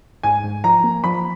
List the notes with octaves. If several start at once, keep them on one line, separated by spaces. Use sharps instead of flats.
G#2 G#5
G#2
F3 A#5
A#3
F3 B5